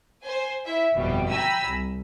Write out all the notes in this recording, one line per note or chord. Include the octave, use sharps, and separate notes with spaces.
C5 G#5
E4 E5
G1 F2 G#2 B2 G3
G5 G#5 A#5 B5 E6
C2